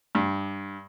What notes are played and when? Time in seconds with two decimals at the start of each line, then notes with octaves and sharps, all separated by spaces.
0.15 G2